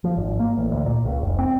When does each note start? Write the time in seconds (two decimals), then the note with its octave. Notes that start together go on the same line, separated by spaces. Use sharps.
0.04 F3
0.17 G#1
0.39 A#3
0.57 A1
0.71 D2
0.86 A#2
1.05 C#2
1.21 F1
1.39 C4